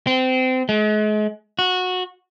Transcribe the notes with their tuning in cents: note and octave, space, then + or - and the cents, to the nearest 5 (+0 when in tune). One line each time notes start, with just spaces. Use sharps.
C4 -25
G#3 +40
F#4 -15